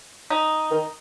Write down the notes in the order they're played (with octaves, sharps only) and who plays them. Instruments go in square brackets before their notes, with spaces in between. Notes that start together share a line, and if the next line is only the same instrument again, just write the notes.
[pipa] D#4
[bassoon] D#3